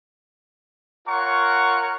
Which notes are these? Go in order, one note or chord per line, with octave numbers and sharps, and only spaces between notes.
F4 A#4 C#5 F#5 A#5 C#6